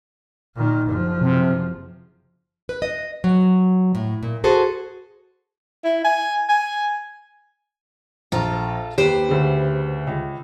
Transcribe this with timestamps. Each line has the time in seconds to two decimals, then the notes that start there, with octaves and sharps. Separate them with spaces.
0.56 A#2 D#3
0.86 F#1 F3
1.21 C3
2.69 B4
2.82 D#5
3.24 F#3
3.95 A2
4.23 A#2
4.44 F#4 G#4 A4 C5
5.85 E4
6.04 G#5
6.49 G#5
8.32 A#1 F4 A4 A#5
8.98 D#2 G4 B4 C5
9.29 D2 C#3
10.07 C#2